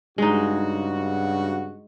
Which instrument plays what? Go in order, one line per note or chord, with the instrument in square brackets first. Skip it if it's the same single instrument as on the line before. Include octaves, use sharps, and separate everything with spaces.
[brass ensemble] G2 C#3 F#4 [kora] G#3 D#4